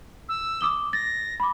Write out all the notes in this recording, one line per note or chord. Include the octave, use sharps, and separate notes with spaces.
E6
D6 D#6 G7
A6 A#6
B5 D6